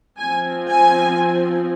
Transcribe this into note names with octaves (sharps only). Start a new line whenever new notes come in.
F3 C4 G#5
G#5